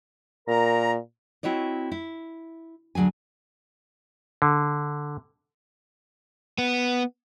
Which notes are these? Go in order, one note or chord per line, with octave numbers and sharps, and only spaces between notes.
A#2 A#4 A#5
C4 E4 F#4 C#5 D#5
E4
D2 F#3 G#4 G#5
D3
B3